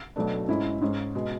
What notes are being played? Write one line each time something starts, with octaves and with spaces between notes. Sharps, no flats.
B1 B2 A3 D4
G#2 G#3 C#4 E4
G#2 G#3 C#4
B2 G#3